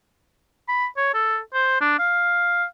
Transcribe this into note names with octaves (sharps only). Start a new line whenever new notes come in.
B5
C#5
A4
C5
D4
F5